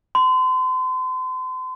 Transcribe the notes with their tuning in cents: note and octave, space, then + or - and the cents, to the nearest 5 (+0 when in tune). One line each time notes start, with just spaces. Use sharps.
C6 -35